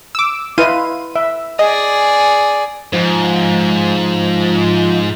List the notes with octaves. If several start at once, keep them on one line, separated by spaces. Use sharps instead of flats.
D6 E6
E4 B4 D#5 F5 C6 D#7
E5
G#4 D5 D#5
G#2 F3